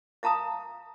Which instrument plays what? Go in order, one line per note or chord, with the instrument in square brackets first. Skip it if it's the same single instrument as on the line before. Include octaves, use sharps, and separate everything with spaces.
[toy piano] E5 F5 A5 A#5 D#6